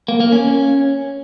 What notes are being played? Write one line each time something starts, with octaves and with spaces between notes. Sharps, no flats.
A#3
A#3
C#4